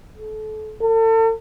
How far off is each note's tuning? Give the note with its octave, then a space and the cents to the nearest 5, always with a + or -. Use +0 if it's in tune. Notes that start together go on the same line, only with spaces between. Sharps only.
A4 -30
A4 +40